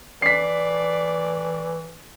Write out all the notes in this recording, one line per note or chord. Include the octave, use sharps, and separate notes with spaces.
E3 D5 B6 C7